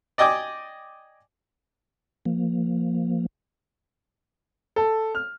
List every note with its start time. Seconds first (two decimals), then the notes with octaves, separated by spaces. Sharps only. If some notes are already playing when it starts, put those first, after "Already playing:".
0.18 D5 D#5 G5 G#5 D6
2.26 F3 A#3
4.76 A4
5.15 F6